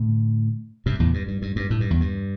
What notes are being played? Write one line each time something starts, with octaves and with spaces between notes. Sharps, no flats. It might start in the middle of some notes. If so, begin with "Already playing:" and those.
Already playing: A2 D3
G2 C3
E2 A2
G2
G2
G2
G2
A2
G2
E2
G2